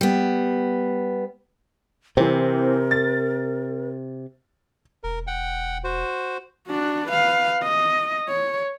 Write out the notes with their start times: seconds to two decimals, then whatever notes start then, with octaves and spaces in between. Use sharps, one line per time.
0.01 G3 B3
2.17 C3 E3 C4 A#4
2.91 A6
5.03 E1 A#4
5.27 F#5 G5
5.84 F#4 C5
6.68 D4 F#4
7.08 B4 F5
7.64 D#5
8.28 C#5